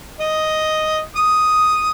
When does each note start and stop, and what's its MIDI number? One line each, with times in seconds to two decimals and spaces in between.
0.20 1.01 75
1.16 1.90 87